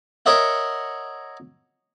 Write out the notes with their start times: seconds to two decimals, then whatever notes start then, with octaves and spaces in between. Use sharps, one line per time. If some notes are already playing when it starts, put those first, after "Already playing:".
0.26 A#4 C#5 D#5 E5 F#5